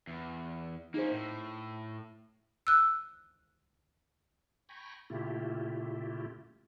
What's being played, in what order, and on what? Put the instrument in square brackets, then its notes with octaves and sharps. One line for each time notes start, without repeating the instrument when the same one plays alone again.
[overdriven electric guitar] E2
[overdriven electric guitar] A#3 C#4 [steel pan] D#4 G#4 C5
[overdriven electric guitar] A2
[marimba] E6 F#6
[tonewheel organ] G5 G#5 A#5 B5 C#6
A#2 C#3 A3 E4 F4 G4